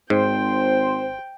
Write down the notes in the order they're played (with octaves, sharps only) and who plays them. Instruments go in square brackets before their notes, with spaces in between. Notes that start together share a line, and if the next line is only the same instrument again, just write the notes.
[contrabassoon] G#1 [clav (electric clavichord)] G#2 [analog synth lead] C5 [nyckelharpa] G5